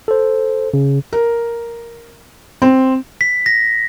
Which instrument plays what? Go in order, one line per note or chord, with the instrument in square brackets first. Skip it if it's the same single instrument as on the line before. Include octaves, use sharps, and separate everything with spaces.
[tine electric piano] A4 C5
C#3
[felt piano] A#4
C4
[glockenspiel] B6
A#6